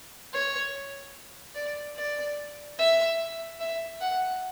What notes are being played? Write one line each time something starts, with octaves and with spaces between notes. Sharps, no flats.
C#5
D5
D5
E5
E5
F#5